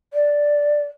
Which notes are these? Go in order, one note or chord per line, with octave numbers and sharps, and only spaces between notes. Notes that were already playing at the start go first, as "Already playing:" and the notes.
D5